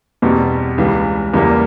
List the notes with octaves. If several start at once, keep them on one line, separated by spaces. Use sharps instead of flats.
E2 B2 G3 C4
C#2 C#3 E3 G3
E2 C#3 E3 G3 A#3